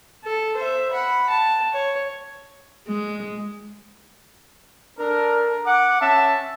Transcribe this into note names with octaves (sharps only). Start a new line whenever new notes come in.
A4
C5 E5
F#5 B5
A5
C#5
G#3
D4 A4 A#4
F#5 D6
C#4 E5 A5